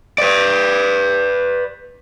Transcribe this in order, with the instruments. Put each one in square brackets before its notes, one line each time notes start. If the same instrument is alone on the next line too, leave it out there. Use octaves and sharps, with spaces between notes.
[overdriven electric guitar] B4 D5